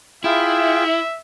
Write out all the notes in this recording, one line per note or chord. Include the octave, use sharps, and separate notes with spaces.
E4 F4 G#4 E5 G5